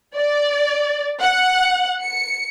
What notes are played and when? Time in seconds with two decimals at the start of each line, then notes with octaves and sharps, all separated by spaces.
0.15 D5
1.21 F#5
2.01 C#7